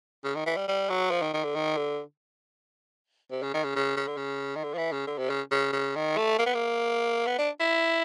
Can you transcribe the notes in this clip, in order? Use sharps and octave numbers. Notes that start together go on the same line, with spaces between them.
C#3
D#3
E3
G3
G3
F#3
F3
D#3
D#3
D3
D#3
D3
C3
C#3
D#3
C#3
C#3
C#3
D3
C#3
D#3
D3
F3
E3
C#3
D3
C3
C#3
C#3
C#3
D#3
A3
A#3
B3
A#3
B3
D4
E4